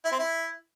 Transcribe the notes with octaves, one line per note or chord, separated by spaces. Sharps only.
E4
C4
E4